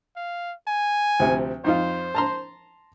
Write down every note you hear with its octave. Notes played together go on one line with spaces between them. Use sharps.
F5
G#5
D2 C3 F3
F2 D#4 F4 C5
A5 A#5 C6